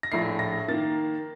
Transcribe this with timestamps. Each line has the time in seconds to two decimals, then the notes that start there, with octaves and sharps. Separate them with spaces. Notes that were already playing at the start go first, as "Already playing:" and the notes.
0.03 A#6
0.12 A#1 A2 A3 C7
0.39 A#6
0.68 D#3 A#3 A6